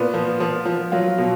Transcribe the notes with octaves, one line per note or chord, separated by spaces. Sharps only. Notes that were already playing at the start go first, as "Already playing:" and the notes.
Already playing: A#2 B3
F3
F3
F3
F#3 F4
B2